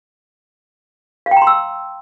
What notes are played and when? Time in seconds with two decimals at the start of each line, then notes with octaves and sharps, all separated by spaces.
1.26 F5
1.31 G5
1.37 A#5
1.42 C6
1.47 E6